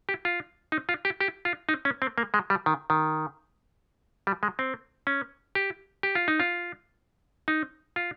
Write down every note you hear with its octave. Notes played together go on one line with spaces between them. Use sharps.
G4
F4
D#4
F4
G4
G4
F4
D#4
C#4
C4
A#3
G#3
G3
D#3
D#3
G3
G#3
C4
C#4
G4
G4
F4
D#4
F4
D#4
F4